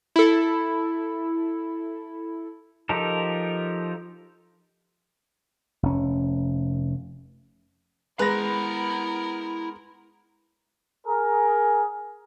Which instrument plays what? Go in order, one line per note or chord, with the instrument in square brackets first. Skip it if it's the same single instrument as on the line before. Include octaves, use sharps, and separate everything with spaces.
[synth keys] E4 A4
[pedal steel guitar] F3 D#4 G4 A4 A#4
[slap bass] F1 C#4
[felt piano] G#3 A#6 [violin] B3 A#4 [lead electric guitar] E4 A#5 [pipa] B4
[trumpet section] G#4 A#4